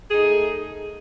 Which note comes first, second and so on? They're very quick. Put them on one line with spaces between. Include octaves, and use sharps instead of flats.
G#4 D#4 A3